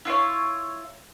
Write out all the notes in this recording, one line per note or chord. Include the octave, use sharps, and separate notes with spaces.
E4 F4 A4 C#5